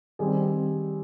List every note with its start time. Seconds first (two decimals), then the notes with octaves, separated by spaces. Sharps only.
0.19 D#3 G3 C4 G#4 G#5